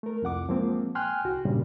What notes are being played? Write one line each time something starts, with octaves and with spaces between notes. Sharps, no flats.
A3 A#4
C2 F2 F#5 D6
F3 G#3 A#3 C4
G5 G#5 C6 F6 F#6
C2 F#4
G2 A#2 C#3 G3